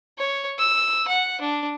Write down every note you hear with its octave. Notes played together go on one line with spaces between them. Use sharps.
C#5
E6
F#5
D4